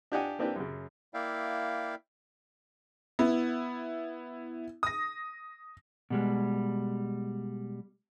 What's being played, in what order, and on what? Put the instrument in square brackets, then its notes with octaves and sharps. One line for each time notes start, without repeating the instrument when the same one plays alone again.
[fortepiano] D4 F4 G4 D#5 F#5 G#5
A#3 C4 D4 E4 G4 B4
F#2 C#3
[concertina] A#3 E4 D5 E5 F5 G5
[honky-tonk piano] B3 E4
D#6 A#6
[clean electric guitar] B2 G3 G#3